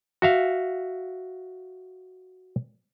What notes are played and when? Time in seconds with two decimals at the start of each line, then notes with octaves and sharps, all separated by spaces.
0.22 F#4 E5 F5